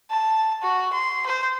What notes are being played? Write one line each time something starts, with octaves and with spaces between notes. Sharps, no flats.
A5
F#4
C6
C5